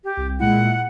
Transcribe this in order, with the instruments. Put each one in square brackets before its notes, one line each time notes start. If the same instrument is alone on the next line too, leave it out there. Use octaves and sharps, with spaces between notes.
[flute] G4
[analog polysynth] C2
[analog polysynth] A#2 G#3 E4 [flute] F#5